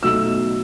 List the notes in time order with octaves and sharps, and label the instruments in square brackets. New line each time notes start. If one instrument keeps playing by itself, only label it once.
[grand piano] B2 F#3 A3 D#4 E6